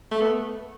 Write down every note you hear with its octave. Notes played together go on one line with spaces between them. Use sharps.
A3
B3